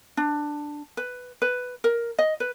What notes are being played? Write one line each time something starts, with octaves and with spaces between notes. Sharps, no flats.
D4
B4
B4
A#4
D#5
B4